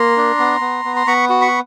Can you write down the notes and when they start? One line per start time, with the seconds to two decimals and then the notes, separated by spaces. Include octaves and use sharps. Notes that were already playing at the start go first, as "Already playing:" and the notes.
Already playing: A#3 A#5 C6
0.17 D4
0.39 B3
0.61 B3
0.85 B3
0.96 C6
1.07 B3 B5 C#6
1.29 F#4
1.41 B5 C#6